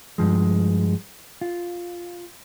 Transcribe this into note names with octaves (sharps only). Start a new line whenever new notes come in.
G2 F3 G#3
F4